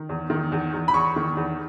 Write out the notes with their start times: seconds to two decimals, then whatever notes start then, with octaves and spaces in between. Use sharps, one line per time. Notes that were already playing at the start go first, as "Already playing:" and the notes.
Already playing: D#3
0.09 E2
0.30 D#3
0.52 E2
0.73 E2
0.88 B5
0.94 E2 C#6
1.16 D#3
1.37 E2